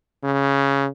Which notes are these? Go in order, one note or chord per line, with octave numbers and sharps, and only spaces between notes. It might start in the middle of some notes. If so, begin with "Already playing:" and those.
C#3